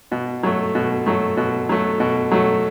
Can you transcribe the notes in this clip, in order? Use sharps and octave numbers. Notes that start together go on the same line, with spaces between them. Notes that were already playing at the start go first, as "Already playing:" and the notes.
B2
F#3 A3
B2
F#3 A3
B2
F#3 A3
B2
F#3 A3